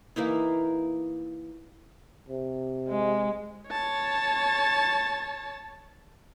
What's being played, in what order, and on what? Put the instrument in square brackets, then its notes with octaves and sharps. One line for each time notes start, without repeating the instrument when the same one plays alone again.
[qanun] E3 A#3 D#4 E4
[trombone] C3
[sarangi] G#3
[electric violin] C#5 A5